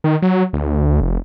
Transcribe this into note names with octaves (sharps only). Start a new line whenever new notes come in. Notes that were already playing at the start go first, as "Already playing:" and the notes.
D#3
F#3
D2
F1